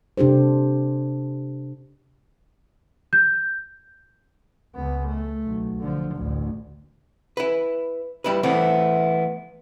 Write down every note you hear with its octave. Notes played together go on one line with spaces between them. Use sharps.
C3 D4 G4 A4 C5
G6
C#2 B3
A3
B1
D3 F3
A1 D2
E4 B4
G3 E4 B4
E3 A3 B3 C4 E4